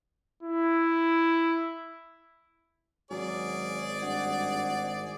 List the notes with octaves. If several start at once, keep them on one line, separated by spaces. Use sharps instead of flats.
E4
G#1 F#3 C#4 G#4 D5
G2 F#4